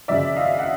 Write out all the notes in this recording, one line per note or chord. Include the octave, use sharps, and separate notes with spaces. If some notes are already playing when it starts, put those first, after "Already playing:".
G#1 F#2 C#3 F3 G#3 D5 E5
D#5 F5
F#5